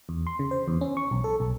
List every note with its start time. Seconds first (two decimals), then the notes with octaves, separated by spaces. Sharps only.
0.09 E2
0.27 C6
0.39 C#3
0.51 C5
0.68 E2
0.81 C#4
0.97 C#6
1.11 B1
1.24 A4
1.40 B1